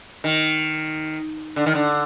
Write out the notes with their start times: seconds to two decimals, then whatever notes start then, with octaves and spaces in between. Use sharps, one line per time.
0.24 D#3
1.56 D3
1.66 D#3
1.75 D3